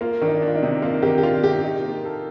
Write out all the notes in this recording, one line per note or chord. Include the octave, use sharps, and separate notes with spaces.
A#3 F4
D#3 D4
D#4
D4
F4
D#4
C3
A#3 F4
D#3 G4
G4
D4 F4
C3 G4
D#4
A#3
A4